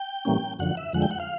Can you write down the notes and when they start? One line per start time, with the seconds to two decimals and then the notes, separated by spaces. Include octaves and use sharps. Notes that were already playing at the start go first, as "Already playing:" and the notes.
Already playing: G5
0.25 A2 E3 G3 A#3 C#4
0.59 F#2 D3 F3 F#5
0.77 E5
0.93 F2 D3 F3 G#3 F#5
1.02 G5
1.11 F#5
1.20 F5